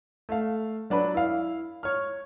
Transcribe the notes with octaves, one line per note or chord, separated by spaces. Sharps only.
A3 F5
F#3 D4 B4 B5
E4 F5
C#5 F6